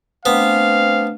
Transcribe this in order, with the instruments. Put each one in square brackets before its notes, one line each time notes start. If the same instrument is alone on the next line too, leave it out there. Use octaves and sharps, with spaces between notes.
[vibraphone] A3 D4 B4 [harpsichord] B3 [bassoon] C4 [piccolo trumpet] F5